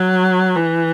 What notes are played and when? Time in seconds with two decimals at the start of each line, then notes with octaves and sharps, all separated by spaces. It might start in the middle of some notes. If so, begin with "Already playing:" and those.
Already playing: F#3
0.56 E3